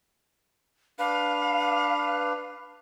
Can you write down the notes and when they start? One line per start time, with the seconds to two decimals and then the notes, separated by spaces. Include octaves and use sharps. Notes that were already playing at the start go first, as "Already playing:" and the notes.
0.99 D4 B4 F5